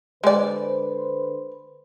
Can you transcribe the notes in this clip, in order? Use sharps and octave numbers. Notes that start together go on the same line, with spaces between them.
D3 G#3 B4 C5 D5